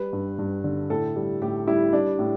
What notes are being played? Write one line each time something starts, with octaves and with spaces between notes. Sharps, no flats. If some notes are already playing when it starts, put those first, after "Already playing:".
Already playing: G3 B4
G2
G2
D3
A2 A4
G3
A2 G4
G3 E4
G3 D4
A2